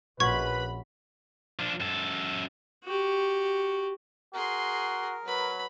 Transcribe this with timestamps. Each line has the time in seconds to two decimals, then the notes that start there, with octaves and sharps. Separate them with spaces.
0.20 A#1 C#4 F4 F#4 B4 B5 C#6 G#6
1.59 F3 D4
1.80 F#2 A4
2.84 F#4 G4
4.34 F#4 G#4 A#4 C6
5.25 F#3 B4 B5